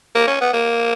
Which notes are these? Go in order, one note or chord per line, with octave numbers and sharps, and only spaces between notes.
A#3
C#4
B3
A#3